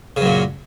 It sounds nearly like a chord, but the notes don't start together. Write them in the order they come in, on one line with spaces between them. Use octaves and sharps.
C#3 F#2 A#2